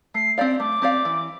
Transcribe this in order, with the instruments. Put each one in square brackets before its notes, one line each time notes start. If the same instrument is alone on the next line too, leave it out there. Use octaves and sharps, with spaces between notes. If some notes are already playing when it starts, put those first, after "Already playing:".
[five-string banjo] A3 [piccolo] C7
[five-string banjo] C4 G4 D5 F5
[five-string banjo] A3 [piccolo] D6
[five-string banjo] C4 G4 D5 F5
E3